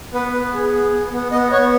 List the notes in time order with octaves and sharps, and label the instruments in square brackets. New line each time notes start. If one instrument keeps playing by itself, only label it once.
[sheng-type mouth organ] B3 B4
B3
G#4
B3
B3
B3
B3 D#5
B3 C#5